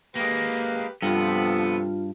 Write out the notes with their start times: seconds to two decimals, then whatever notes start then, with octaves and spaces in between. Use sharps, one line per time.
0.15 G#3 A#3 G4 B4
1.02 G2 C3 F3 B3 F4 A4